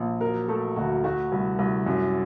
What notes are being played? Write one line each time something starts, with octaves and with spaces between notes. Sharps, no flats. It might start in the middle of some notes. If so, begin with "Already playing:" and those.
Already playing: A#1
F#3 A#4
A3 A4
D2 F#4
A3 F#4
C2
C2
F#2 F#4